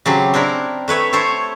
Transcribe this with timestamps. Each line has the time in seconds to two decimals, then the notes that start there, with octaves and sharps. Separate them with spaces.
0.06 C#3 F#3 C4 G4
0.34 C4 D4 E4 A#4
0.88 A3 B4 C#5 E5
1.13 E4 A4 C5 C#5